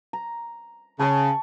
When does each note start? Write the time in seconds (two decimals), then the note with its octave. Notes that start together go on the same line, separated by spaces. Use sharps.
0.13 A#5
0.99 C#3 A5 C#6